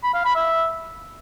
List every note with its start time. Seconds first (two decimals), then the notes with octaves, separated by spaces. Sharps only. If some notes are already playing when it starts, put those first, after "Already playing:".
0.04 B5
0.14 F5
0.25 B5
0.35 E5